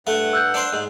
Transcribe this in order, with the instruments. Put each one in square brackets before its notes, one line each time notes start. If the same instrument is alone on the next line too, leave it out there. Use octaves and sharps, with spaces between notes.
[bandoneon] G2 F#5 [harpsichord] A3
[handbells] E6 F#6 G6
[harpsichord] D4 C5
G#2